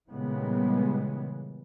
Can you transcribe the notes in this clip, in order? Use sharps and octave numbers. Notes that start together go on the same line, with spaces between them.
A#2 C#3 E3 G3 G#3 B3